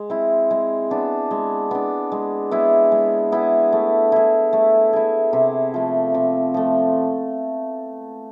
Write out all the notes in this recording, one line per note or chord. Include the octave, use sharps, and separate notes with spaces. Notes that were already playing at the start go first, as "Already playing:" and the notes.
Already playing: G#3
C4 E4
G#3
B3 D4
G#3
B3 D4
G#3
B3 E4 G#4
G#3
B3 E4 G#4
A3
E4 G#4
A3
E4 G#4
C3
F3 A3
C3
F3 A3